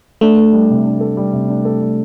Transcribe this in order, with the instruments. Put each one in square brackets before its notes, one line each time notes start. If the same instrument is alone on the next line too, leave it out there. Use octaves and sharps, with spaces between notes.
[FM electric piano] A3 [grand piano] D4
[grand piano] A4
G3
C3
D4
A4
G3
C3
D4
A4
G3